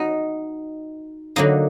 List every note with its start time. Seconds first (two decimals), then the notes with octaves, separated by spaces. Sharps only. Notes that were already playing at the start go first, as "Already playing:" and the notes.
Already playing: D#4 F#4
1.36 D3 F#3 A#3 D#4